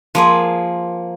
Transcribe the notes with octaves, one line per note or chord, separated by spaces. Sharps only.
F3 A#3 G#4